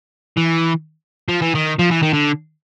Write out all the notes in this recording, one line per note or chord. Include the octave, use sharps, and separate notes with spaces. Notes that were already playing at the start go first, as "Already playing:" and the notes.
E3
F3
E3
D#3
F3
E3
D#3
D3